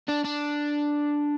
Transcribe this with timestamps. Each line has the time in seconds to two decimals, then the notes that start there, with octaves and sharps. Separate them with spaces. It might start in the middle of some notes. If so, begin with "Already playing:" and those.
0.08 D4
0.24 D4